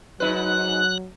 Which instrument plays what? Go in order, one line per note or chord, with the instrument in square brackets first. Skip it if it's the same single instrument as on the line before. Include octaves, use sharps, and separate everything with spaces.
[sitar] G#2 D#4 B4 [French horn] F#3 [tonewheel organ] F#6